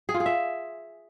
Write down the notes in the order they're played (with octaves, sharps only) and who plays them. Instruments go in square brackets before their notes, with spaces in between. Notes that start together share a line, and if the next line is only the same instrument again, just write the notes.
[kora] G#4
F4
G#4
E5